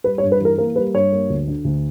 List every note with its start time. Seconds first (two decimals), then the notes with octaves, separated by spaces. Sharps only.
0.04 G3 B4
0.18 C#5
0.23 G2
0.32 B4
0.40 E3 A#4
0.58 A#3 A#4
0.76 G3 B4
0.95 G2 C#5
1.12 A#3
1.30 D2
1.48 D3
1.65 D2